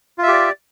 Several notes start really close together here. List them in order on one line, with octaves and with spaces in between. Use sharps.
F4 E5 G4 D5